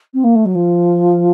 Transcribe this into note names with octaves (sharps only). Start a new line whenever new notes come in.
C4
A#3
A3
F#3
F3